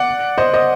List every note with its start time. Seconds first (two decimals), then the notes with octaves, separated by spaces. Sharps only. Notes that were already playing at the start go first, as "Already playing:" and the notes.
Already playing: D5 F#5
0.38 C5 D#5
0.54 C5 D#5